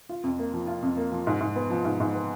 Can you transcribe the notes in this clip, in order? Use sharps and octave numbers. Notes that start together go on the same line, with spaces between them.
F4
F2
A#3
F3
F4
F2
A#3
F3
G#2
G#2
B3
F3
G#2
G#2
B3